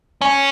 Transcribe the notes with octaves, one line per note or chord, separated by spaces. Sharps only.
C#4